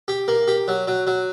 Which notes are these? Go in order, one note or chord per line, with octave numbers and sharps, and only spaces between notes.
G4
A#3
G4
F#3
F#3
F#3